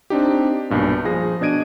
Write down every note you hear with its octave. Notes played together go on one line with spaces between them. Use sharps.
C4 D4 D#4 G4
B1 G2 A#2
F3 G#4 A#6
B2 D4 D#5 G#6 D7 D#7